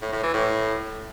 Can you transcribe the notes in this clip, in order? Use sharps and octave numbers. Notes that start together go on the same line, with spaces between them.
A2
A2
E3
A2